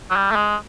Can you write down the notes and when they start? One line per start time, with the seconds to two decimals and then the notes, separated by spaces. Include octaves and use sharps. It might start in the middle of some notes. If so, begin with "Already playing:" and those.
0.10 F#3
0.16 G3
0.31 A3
0.36 G#3